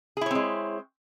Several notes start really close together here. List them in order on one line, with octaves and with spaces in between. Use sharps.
G#4 E4 C#5 C4 G#3